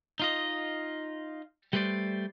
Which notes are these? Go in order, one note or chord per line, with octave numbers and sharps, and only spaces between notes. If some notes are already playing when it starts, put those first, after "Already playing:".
D#4 F4 D#5
G3 A3 B4 C5 D5